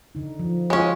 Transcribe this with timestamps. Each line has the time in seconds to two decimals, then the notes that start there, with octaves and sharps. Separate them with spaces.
0.15 D3 D#4
0.40 F3
0.70 G#3 C#4 F4 F#4 C#5